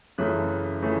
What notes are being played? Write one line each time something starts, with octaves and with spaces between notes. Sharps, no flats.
F#2 C#3 E3 A3 F#6
C#3 E3 A3